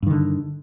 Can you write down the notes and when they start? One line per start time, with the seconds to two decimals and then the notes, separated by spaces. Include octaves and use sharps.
0.03 G2
0.06 D#3
0.10 D3